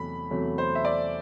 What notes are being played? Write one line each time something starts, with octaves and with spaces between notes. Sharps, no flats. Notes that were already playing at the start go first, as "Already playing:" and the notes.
Already playing: E2 C3 F#3 A3 B5
E2 C3 F#3 A3
C5
E5
D5